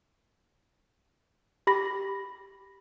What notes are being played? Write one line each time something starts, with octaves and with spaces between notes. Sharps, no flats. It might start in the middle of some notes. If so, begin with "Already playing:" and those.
G4 B5 A#6